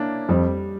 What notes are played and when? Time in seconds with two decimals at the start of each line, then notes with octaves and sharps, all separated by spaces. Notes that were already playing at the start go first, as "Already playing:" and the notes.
Already playing: A#3 C#4 D4 E4
0.29 F2 G3